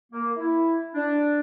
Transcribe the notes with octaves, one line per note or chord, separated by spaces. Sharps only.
A#3
E4
D4